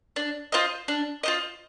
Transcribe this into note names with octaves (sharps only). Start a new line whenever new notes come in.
D4
F4 C5 D#5
D4
F4 C5 D#5